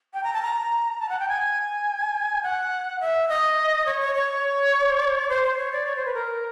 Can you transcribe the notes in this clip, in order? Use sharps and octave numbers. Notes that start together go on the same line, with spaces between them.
G5
A#5
A5
A#5
A5
F#5
G5
G#5
F#5
E5
D#5
C#5
C#5
C#5
C5
C5
C#5
D5
C#5
C5
B4
A#4